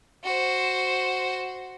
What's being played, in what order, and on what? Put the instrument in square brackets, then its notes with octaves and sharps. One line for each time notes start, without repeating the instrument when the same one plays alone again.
[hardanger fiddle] F#4 C5